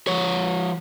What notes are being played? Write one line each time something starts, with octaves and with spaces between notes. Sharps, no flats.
F3 C#5